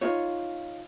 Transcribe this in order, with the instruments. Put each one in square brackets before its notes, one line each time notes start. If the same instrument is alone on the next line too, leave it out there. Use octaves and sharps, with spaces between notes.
[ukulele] D#4 F4 C#5